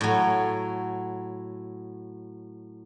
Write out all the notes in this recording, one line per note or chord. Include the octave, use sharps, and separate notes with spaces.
A2 F#3